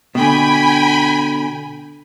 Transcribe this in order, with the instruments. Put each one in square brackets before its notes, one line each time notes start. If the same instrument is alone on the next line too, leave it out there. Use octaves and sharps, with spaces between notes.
[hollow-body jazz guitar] B2 D3 [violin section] G5 G#5 B5